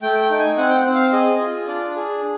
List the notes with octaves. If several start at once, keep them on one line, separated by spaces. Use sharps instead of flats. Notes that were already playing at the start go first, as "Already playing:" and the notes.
A3 G5
G5
D#4
G#5
C4 F#5
G5
F#5
C4
F5
G#4 D#5
F4
D4 D5
G#4